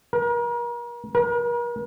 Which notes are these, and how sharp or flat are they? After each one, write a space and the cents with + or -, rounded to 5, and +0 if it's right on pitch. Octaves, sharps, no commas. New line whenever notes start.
A#4 +40
A#4 +45